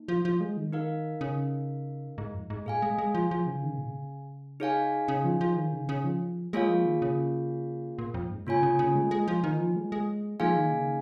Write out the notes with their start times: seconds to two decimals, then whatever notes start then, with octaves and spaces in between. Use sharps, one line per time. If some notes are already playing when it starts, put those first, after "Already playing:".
Already playing: A#3 D#4
0.08 F3
0.25 F3
0.41 G#3
0.57 D#3
0.73 D#4 A#4 F5
1.21 C#3
2.18 G#2
2.34 F2
2.50 G#2
2.66 A#2 G#4 F5 G#5
2.82 G#3
2.98 G#3
3.15 F3
3.31 F3
3.47 C#3
3.63 D#3
3.70 C#3
3.78 A#2
3.85 C#3
4.60 D#4 G#4 C#5 F5 G#5
5.08 C#3
5.24 F3
5.41 F3
5.56 D#3
5.73 C#3
5.89 C#3
6.04 F3
6.53 G#3 A#3 F4 G#4 C#5 F5
6.69 F3
6.85 D#3
7.02 C#3
7.99 A#2
8.14 F2
8.31 G#2
8.47 C#3 A#3 F4 C#5 G#5
8.63 C#3
8.79 C#3
8.95 G#3
9.11 G#3
9.28 F3
9.44 D#3
9.59 F3
9.76 G#3
9.92 G#3
10.40 F3 A#3 D#4 G#4 F5 G#5
10.56 D#3
10.72 C#3